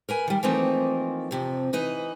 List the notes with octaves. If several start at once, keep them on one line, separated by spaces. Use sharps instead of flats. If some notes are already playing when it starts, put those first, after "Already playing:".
A#4 B4 G#5
D#3 G3
E3 F3 A3 A#3 C4 D#4
F2 C3 F3
E3 D#4 B4 D#5